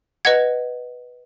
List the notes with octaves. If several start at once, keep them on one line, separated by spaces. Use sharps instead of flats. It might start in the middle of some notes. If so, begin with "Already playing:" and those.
B4 D#5 F#5 G#6